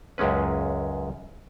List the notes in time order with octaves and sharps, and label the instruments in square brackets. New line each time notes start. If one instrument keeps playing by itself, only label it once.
[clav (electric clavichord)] C#2 F#2 G#3 C#4 B4